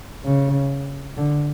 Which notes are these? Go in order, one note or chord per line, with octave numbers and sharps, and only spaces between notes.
C#3
D3